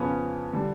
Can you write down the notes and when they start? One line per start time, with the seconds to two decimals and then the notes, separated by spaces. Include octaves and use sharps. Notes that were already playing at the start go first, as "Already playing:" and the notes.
Already playing: F2 C#3 F3 B3 C#4
0.53 D3 G3